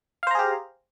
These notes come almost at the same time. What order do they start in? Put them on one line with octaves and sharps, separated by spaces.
F5 C5 A#5 G#4 G4